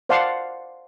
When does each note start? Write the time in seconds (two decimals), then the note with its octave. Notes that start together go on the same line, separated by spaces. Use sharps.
0.09 C5 D5 F5 F#5 A5 C6